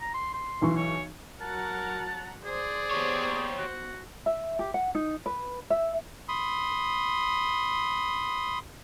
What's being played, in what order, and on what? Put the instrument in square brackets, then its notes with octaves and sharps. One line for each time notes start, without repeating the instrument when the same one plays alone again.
[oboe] A#5
C6
C6
[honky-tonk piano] B1 E3 C#6
[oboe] C#5
[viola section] F#3 F#5 A#5 [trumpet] A#4 [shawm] A5
[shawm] G#4 [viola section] C5 [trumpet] D5
[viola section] B3 C5 [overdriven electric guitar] G4 C#5
[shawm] F#4
[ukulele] E5
G4
F#5
D#4
B4
E5
[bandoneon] B5 C6 D#6